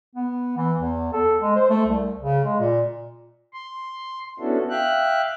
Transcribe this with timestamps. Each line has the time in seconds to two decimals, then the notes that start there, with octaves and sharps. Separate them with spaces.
0.16 B3
0.57 E3
0.79 E2
1.13 A4
1.41 G#3
1.56 C5
1.70 A3
1.86 C2
2.22 C#3
2.45 G#3
2.59 A#2
3.53 C6
4.39 B3 C#4 D4 E4 F#4 A4
4.70 E5 F5 G5 F#6